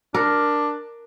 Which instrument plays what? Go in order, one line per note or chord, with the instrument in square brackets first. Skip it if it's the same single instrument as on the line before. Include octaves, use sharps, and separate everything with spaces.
[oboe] D4 [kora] A#4